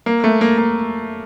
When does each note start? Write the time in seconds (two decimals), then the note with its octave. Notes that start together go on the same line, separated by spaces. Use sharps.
0.06 A#3
0.24 A3
0.41 A#3
0.58 A#3